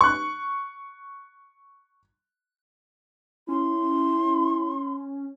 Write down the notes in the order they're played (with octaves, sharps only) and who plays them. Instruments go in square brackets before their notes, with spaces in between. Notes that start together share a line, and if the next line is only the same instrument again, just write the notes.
[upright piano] C#6 F#6
[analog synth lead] C#4 [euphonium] E4 [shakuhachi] C6